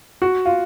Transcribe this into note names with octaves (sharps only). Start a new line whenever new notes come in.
F#4
F4